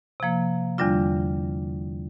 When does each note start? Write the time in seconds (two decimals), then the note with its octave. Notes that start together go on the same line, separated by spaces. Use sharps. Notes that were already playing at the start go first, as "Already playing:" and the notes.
0.20 C3 F3 A#3
0.78 E2 D3 G3 D4 F4